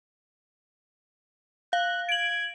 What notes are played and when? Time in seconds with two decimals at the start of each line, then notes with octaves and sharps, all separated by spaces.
1.73 F5 F#6
2.09 G#6 D7 F#7